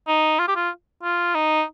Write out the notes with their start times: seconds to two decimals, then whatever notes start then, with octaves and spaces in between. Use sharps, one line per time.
0.08 D#4
0.39 F4
0.48 G4
0.56 F4
1.03 F4
1.35 D#4